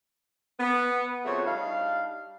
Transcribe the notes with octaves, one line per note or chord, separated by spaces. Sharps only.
B3
C#3 F3 A3 C4 F#4 C#5
G3 D4 D#4 F5